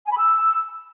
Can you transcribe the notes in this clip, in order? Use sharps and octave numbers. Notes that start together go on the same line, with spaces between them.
G#5
B5
E6